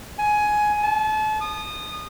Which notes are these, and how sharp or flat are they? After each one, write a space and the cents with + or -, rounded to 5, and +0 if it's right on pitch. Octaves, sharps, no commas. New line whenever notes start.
G#5 +15
A5 -35
D#6 -25